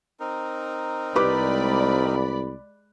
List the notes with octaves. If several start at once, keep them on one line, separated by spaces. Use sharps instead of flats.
C4 D#4 A#4
C2 G#3 G4 B4 D5 B5 D6